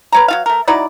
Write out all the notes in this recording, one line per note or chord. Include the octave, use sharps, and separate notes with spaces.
B4 C#5 A#5
F#3 F4 F5
A3 A#4
F#3 D#4 E4 D5